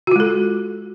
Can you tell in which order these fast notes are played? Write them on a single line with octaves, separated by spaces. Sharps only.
F#4 F4 G#3 A4